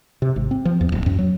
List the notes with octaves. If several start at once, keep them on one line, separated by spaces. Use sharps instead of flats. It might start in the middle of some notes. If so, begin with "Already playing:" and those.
C3
G#1
C4
F3
E2
D1
F#2
F#3